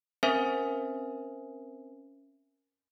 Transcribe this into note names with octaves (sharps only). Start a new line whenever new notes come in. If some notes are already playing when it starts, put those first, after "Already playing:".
C4 C#4 A#4 C5 E5 G#5